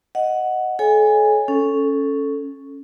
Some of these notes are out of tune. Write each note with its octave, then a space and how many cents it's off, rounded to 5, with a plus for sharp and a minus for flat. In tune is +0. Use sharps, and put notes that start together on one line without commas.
D#5 +0 F#5 +0
A4 -40 C#5 +0 G#5 -20
C#4 +0 A4 +0